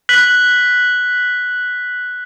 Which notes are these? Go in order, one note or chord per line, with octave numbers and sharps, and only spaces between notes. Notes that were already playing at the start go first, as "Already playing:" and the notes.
F#6 B6 F#7